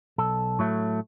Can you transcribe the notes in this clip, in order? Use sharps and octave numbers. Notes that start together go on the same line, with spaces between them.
B1 A4
A2 F#3 A3